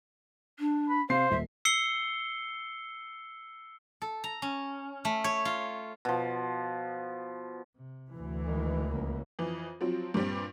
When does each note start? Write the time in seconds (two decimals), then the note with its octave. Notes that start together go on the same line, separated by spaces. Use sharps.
0.59 D4
0.89 B5
1.10 C3 C5 F5 C7
1.31 D#1 E5
1.65 E6 C7 C#7 G7
4.02 A4
4.24 A#5
4.42 C#4
5.05 A3
5.24 C#5
5.45 F4
6.05 B2 F3
7.76 C3
8.12 D2 E3
8.46 D#3 G#3
8.89 C#2 A#3
9.39 F2 E3
9.81 F3 F#3 C4
10.14 G2 A#2 G3 C4